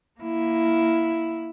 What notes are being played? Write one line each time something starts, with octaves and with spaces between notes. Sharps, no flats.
A#3 E4